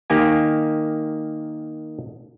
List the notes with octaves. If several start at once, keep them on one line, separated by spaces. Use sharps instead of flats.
D#3 A#3 G4 G#5